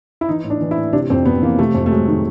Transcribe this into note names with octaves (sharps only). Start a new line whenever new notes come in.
E4
E3 D#4
A2
D4
E3
E4
A2
C3 D4
F2 C4
F2 B3
E3 A#3
C3 A3
F2
A3
F#3 G#3
D#3